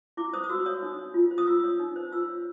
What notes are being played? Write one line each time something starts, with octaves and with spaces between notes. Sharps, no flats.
E4 D6
C5 D#6
D#6
F#4 E6
C#5 D#6
D#4
C#5
F4
C5
D#6
F4 E6
C#5
D#4
C5
F4 E6
C#5